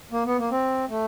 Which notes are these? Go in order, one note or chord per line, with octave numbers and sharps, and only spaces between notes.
A#3
B3
A#3
C4
A3